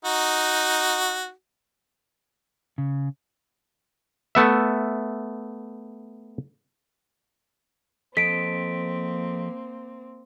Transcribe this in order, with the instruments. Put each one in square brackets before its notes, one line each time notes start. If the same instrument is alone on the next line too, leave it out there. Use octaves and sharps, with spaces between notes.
[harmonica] D#4 F#4
[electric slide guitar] C#3
[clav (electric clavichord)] A3 B3 E5
[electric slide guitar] F3 A4 D#5 [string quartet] A#3 C4 [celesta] B6 D7